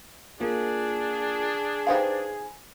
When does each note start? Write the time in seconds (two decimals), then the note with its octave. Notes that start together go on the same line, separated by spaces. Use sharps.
0.40 A#3 D4 F4 G#4
1.87 D#4 G4 B4 C5 F5 G#5